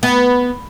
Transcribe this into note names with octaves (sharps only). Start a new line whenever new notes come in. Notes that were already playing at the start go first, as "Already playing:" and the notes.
B3